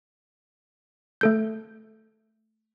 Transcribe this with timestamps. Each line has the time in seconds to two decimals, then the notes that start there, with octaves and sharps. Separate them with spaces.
1.21 A3 A4 G6